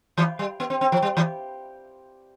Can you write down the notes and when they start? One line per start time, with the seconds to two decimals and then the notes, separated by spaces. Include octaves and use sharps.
0.17 E3
0.39 G3
0.60 B3
0.70 C4
0.81 C4
0.92 F3
1.02 G3
1.17 E3